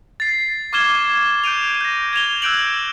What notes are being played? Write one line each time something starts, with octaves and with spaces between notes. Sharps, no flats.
A6 C7
C#6 D6 F6 G#6 E7 G7
G6 D7 D#7 F7
G6 A#6
G#6 E7 F7 G7
E6 F#6 G6 D7 E7 F#7